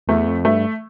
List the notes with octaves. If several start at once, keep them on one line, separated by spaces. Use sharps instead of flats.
E2 A3
F2
G2 A3